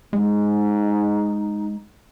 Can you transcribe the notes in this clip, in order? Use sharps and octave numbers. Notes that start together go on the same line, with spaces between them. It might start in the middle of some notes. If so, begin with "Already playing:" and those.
G#2 G#3 D#4